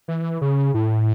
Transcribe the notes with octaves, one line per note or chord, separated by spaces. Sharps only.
E3
C#3
A2